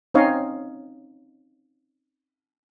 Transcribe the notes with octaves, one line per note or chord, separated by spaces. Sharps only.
C4 C#4 D#4 C#5 D#5 F5